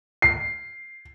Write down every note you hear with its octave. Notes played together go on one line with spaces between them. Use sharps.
C7